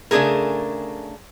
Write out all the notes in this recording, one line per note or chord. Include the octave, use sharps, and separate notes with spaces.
C#3 A3 D4 D#4 G#4 A#4